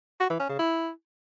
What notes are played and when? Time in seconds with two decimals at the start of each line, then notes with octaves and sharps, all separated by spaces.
0.20 F#4
0.30 E3
0.40 C#4
0.50 C#3
0.59 E4